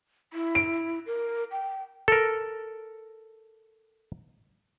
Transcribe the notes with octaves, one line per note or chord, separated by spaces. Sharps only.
E4
D7
A#4
G5
A4 A#4